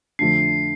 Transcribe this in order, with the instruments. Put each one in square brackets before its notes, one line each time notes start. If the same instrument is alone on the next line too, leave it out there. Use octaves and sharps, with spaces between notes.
[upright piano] F2 D3 A3 D4 [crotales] C7